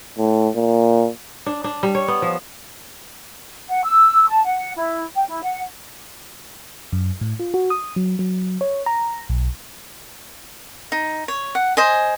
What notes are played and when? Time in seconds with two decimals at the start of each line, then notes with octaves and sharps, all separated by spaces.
0.18 A2
0.55 A#2
1.46 D4
1.64 D4
1.83 G3
1.95 C#5
2.08 B3
2.22 F3
3.69 F#5
3.83 E6
4.28 A5
4.44 F#5
4.76 E4
5.16 G5
5.28 E4
5.43 F#5
6.92 F#2
7.21 A2
7.40 F4
7.54 F#4
7.70 D#6
7.96 F#3
8.19 F#3
8.61 C#5
8.86 A#5
9.29 B1
10.92 D#4
11.28 C#5
11.55 F#5
11.77 C5 D#5 G#5